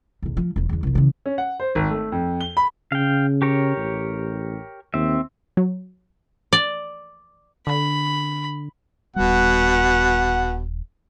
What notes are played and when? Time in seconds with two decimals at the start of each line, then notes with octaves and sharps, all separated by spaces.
0.22 B1 E2
0.37 F3
0.56 E1 E3
0.69 E2 D3
0.83 C2 F3
0.95 C#3 E3
1.26 C#4
1.38 F#5
1.60 C5
1.75 G#1
1.90 A3
2.12 F2
2.41 G7
2.57 B5
2.92 C#3 F5 G5
3.42 G4 A#4 C#5
3.77 A1
4.94 D#2 C4 E5
5.57 F#3
6.53 D5
7.67 D3 B5
9.16 D#1 B2 G3 F#5